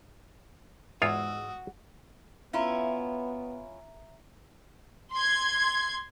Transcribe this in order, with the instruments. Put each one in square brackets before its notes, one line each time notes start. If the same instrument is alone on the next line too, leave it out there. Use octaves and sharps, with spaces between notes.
[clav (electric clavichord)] E2 F4 C#5 [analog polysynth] G#2 G#3 E6 [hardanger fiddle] F#4 [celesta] D#6
[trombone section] B3 [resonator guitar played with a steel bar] C#4 E4 F4 [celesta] E5 A#5
[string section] C6 G#6